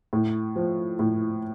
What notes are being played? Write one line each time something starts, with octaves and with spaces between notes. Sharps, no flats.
A2
F3
A2